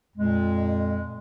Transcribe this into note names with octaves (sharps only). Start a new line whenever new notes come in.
F2 A#2 G#3